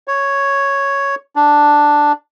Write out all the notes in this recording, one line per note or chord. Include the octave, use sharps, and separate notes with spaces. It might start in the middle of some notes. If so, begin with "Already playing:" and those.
C#5
D4